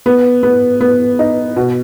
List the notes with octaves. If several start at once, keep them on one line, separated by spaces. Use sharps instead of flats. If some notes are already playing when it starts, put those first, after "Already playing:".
B3
B3
B3
D#4
B2